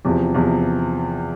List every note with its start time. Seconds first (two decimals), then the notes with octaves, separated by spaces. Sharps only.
0.05 E2 C3 F3
0.35 E2 C3 F3